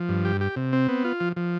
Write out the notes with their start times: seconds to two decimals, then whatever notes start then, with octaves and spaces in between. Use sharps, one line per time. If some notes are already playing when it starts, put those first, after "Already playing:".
Already playing: F3
0.09 G2
0.25 G4
0.41 G4
0.56 C3
0.73 C4
0.88 B3
1.05 F4
1.20 F3
1.36 F3